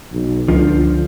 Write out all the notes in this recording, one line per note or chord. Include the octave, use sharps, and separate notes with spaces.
B1
C#2 D3 F3